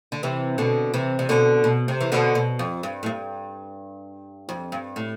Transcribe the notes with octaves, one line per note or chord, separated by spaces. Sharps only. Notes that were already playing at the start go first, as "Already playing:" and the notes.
D3
C3 E3
B2 D3
C3 E3
C3
B2 D3
B2
C3
E3
B2 D3
B2
F2
G2
A2
G2
F2
G2
A2